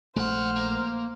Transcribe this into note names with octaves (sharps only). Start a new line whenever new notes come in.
A#1 G#3 A3 C5 F#5 F6
A#3